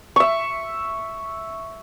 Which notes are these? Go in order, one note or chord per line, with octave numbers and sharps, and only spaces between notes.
E5 C#6